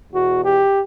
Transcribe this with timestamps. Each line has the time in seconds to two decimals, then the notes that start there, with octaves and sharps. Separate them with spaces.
0.11 E2 B2 F#4
0.44 G4